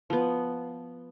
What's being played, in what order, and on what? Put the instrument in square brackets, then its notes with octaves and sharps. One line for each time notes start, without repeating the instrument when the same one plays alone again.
[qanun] F3 B3